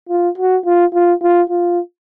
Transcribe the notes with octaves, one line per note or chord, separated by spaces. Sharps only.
F4
F#4
F4
F4
F4
F4